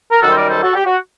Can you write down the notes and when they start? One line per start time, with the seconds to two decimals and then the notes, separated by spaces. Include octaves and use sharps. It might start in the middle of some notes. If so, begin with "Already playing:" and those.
0.11 A#4
0.21 F#2 D#3 G3 F#4 A4
0.30 C5
0.35 A#4 D5
0.49 A4 C5
0.62 F#4 A4
0.75 G4
0.85 F#4